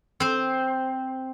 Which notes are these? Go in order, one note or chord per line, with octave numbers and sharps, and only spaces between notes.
C4 C5